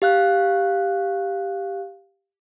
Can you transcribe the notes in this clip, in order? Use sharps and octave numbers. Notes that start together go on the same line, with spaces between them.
G4 F5 F#6